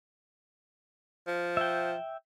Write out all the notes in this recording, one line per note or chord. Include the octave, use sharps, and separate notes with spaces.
F3
E5 G5